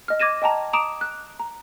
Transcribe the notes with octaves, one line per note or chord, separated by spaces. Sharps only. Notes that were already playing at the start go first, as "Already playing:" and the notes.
D#5 F6
D6 G#6 A#6 D#7 E7
D#5 G5 A5 A#5
A#5 D6 D#6 D7 E7
F#6
A#5